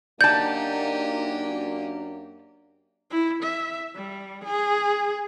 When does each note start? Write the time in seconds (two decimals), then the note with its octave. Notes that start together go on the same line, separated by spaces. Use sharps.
0.21 F#2 A#3 D4 D#4 G4 D5 A5 G6
3.10 E4
3.42 E5
3.95 G3
4.44 G#4